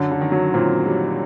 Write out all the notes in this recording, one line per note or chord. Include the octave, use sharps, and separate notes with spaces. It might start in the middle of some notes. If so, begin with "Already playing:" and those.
Already playing: F#2 D3
D3
D#3
F#3
A#2 C4
G3